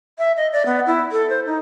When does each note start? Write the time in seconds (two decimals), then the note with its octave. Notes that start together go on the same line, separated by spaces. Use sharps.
0.18 E5
0.37 D#5
0.53 D5
0.66 B3
0.86 E4
1.12 A4
1.29 C5
1.46 D#4